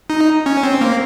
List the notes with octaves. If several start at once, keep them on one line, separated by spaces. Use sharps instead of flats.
D#4
C#4
C4
A#3